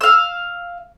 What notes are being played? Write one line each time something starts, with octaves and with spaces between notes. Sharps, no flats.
F5 E6